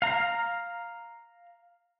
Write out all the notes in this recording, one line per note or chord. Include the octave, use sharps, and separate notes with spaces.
F5 A#5